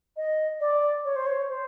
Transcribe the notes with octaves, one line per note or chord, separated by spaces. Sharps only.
D#5
D5
C#5
C5
C#5
C5